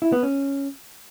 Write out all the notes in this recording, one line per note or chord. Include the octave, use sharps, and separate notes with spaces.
E4
B3
C#4